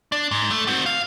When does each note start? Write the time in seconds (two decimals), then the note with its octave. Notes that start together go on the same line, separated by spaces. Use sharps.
0.12 D4
0.31 G#2
0.51 A3
0.67 C4 F#4
0.86 F5